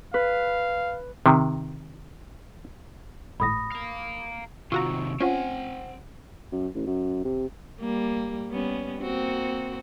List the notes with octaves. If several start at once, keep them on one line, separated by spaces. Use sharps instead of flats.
B4 F5
C3 D#3
G#1 A2 B5 D#6 A#6
F5 A#5
C3 D#3 F4 F#4 A#5 C#6 E6
C4 C#4 F4 C5 F#5 G#5
F#2
A1
F#2
C3
G3 A#3
G3 B3 C#4
A#3 C4 F#4